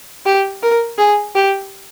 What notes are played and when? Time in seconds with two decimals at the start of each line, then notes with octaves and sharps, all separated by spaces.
0.26 G4
0.63 A#4
0.98 G#4
1.35 G4